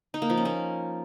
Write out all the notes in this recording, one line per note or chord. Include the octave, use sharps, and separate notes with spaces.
D#4
A#3
F3
C#4
A#3